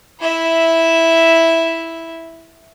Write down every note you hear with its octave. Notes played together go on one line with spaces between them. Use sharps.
E4 E5